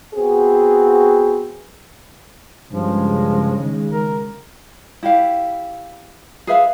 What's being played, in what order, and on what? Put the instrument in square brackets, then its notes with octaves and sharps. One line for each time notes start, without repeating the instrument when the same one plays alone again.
[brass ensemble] B3 C4 F#4 G#4
[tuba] G2 [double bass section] C#3 G#3 [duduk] F3
[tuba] D#3
[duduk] A#4
[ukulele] E4 G4 F5
G#4 B4 E5 F5